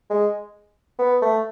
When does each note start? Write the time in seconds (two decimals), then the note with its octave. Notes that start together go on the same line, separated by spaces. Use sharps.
0.10 G#3
0.99 B3
1.22 A3